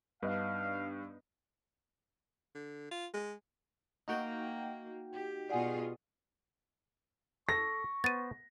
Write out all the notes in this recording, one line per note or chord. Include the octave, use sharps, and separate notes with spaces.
G2 B3 D4 D#4 B4 F5
D3
F4
G#3
A#3 D#4 F#4 G5
G4
B2 F4 G#4 D5 F#5 G#5
A4 C#6 A#6
B3 C5 A6 D#7